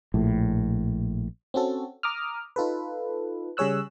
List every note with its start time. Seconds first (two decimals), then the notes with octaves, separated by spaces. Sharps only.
0.14 A#1 A2
1.54 C4 C#4 F#4 A4
2.03 A#5 D6 D#6 F6
2.56 D#4 F4 A4 B4
3.57 C#3 G3 G#4 C#5 E6 F#6